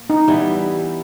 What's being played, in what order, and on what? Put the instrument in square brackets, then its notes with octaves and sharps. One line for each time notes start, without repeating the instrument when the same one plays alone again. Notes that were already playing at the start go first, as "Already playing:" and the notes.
Already playing: [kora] A#3
[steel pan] D#4
[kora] E3 G3 B3